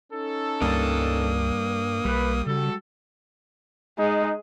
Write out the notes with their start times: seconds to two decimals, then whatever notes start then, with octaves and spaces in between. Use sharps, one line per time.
0.13 C#4 D#4 A4
0.61 C#2 G2 G3 A#3 D4 D#6
2.05 B1 G3 B4
2.47 C#3 F#4 A4
3.99 G#3 D#4